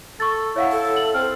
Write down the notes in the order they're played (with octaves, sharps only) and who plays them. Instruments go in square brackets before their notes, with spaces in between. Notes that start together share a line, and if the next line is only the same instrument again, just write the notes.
[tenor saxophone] A4 [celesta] C#6 A6
[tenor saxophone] E4 [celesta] C#5 F5 F#5
[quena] A4
[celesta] F#7
[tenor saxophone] C4 [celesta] F6